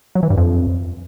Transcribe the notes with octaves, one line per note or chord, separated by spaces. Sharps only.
F#3
E3
G2
F2